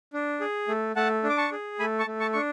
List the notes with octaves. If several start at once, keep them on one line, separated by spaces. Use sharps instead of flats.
D4
G#4
A3
A3 F#5 A5
D4
D6
A5 C#6
G#4
A3 G#5 B5
A5 C#6
A3
A5 C#6
D4 C#6